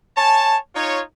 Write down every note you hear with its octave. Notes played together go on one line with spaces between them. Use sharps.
C#5 G#5 A5
D#4 F4 C#5